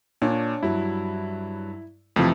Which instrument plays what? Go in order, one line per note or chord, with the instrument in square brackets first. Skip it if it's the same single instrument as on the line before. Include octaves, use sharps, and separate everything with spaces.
[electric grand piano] A#2 [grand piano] D4 C#5
[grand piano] G2 F#3 [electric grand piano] E4
[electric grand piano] F2 F3 [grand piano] C3 E3 A3